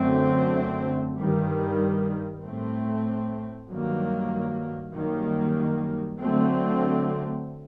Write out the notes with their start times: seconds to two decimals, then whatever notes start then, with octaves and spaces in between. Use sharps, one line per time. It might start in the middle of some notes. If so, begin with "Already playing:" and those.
Already playing: F#2 D3 A3 C4
1.17 G2 D#3 G3
2.41 A2 A3 C4
3.68 G2 D#3 F#3 A#3
4.93 F#2 D#3 G3 A#3
6.19 D3 F#3 A3 C4